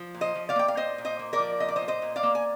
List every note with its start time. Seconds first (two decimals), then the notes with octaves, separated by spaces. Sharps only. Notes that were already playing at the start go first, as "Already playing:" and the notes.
Already playing: F3
0.14 A#2
0.21 C5 D#5
0.35 F3
0.49 D5 F5
0.56 A#3 G5
0.68 F5
0.77 A#2 C5 D#5
0.98 A#2
1.05 C5 D#5
1.19 A#3
1.33 A#4 D5
1.39 F3
1.60 A#2 D#5
1.68 D5
1.76 C5 D#5
1.81 A#2
1.88 C5 D#5
2.02 A#2
2.16 D5 F5
2.23 A#3
2.35 G#5